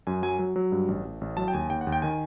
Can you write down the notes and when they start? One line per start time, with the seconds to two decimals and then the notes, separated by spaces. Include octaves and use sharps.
0.07 F#2 G#5
0.23 F#3 G#5
0.39 F#3
0.56 F#3
0.72 G2
0.88 A1
1.05 A1
1.21 A1
1.37 F#3 A5
1.48 G5
1.53 D#2 G#5
1.70 D#2 G5
1.81 F#5
1.87 D#2
1.92 G5
2.02 D#3 G#5